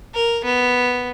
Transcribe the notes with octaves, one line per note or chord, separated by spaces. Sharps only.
A#4
B3